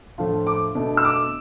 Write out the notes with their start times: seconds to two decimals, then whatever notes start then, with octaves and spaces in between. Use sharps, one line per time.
0.18 A2 F3 A3 D4 F4
0.47 D6
0.75 B2 A3 D4
0.97 E6
1.05 D6